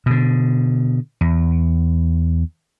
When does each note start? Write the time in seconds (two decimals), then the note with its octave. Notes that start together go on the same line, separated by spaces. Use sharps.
0.06 B2 D3
1.21 E2